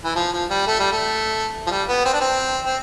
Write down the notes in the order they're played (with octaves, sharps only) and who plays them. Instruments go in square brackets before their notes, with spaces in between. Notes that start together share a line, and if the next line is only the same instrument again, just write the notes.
[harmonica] E3
F3
F3
G3
A3
G3
A3
F3
G3
B3
C4
D4
C4
C4